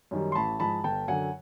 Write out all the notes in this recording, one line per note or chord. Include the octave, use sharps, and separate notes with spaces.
F#2 D#3 G3
C6
A1 A5 B5
G#2 F3 G#3 A5 B5
G1 G5 A5
F#2 D3 F#5 G#5